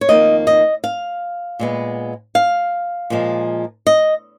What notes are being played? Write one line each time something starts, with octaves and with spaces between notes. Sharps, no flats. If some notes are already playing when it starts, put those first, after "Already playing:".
C#5
F2 D#3 A#3 D#5
D#5
F5
A#2 G#3 B3
F5
A#2 F3 G#3
D#5